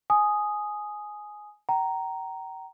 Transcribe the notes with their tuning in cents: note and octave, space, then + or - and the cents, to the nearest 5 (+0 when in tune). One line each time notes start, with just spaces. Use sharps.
G#5 +10 D#6 +0
G5 -40 A#5 +0